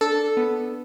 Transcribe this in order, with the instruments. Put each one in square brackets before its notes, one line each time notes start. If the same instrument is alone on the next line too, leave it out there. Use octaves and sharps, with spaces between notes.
[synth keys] D4 A4
B3